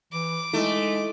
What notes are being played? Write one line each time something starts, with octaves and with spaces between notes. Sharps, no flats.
E3 D6
G#3 A3 D#4 E4